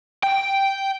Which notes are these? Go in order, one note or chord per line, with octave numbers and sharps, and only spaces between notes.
G5